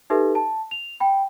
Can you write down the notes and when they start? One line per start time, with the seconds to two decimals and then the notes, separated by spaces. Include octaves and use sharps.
0.10 D#4 G4 A4 B4 E5
0.35 A5
0.71 F7
1.00 G5 B5